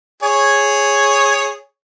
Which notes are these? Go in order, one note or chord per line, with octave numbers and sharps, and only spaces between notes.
G#4 C#5